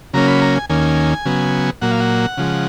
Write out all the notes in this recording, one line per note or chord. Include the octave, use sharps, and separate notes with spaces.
C#3 F#3 A#3 C#4 A#5
B5
A#5
G#5
D#2 D#3 A#3 C#4 G#5
C#3 F#3 B3
A#2 F#3 A#3 F#5
F5
F#5
C#3 F3 G#3